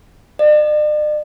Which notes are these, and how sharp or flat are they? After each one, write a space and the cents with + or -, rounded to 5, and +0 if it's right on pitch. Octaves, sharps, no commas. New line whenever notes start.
D5 +45